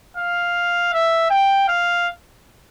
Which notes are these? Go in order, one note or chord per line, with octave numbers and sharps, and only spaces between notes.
F5
E5
G5
F5